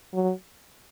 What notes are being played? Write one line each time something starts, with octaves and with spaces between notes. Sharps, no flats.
F#3